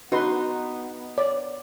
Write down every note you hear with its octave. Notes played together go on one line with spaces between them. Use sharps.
B3 D#4 F#4 B4 C6
C#5 D5